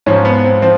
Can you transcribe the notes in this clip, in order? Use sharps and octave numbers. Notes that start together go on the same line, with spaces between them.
G#2 F3 C#4
B3
C4
F3 C4